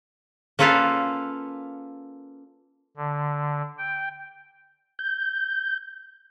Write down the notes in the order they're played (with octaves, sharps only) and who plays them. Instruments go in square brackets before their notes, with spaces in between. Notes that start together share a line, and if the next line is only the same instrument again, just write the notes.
[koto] A#3 C#4 F4 A4 B4 F5
[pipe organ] D3
G5
[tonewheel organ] G6